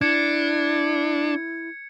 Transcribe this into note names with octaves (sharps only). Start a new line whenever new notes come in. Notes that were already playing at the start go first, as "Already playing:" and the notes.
D4 E4 G#6 C#7